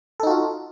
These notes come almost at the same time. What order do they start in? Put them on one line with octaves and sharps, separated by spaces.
A4 D#4 F#4 F4